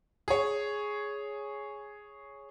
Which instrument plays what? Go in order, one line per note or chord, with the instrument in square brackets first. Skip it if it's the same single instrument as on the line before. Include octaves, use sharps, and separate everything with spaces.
[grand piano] G#4 C#5